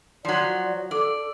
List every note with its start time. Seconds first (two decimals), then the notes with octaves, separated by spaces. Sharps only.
0.25 F3 F#3 D5
0.91 A4 D5